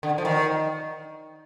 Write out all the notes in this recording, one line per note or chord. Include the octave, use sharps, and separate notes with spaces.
D3
F3
D#3